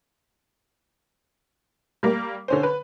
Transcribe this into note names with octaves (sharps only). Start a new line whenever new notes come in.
G3 A#3
D3 C#4 C5
B4